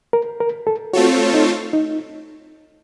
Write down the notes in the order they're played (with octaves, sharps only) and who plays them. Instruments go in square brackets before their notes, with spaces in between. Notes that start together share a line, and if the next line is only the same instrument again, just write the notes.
[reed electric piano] A#4
A#4
A4
[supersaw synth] A3 C4 F4 A4 C#5 [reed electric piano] F#4
[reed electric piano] D#4
D#4